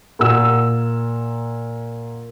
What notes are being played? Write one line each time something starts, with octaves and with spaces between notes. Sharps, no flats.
A#2 A#4 F#5 E6